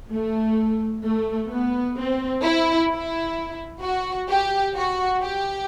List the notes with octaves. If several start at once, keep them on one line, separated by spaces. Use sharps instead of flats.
A3
A3
B3
C4
E4
E4
F#4
G4
F#4
G4